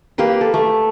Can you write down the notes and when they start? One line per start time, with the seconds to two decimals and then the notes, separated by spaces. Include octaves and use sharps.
0.18 A#3 G4 B4 C6
0.41 A4
0.54 A3